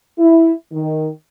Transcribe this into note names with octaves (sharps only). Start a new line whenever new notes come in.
E4
D#3